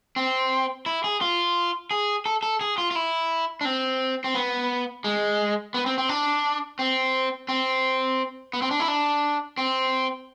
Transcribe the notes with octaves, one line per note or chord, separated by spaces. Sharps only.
C4
E4
G#4
F4
G#4
A4
A4
G#4
F4
F4
E4
D4
C4
C4
B3
G#3
B3
C4
C4
D4
C4
C4
B3
C4
D4
E4
D4
C4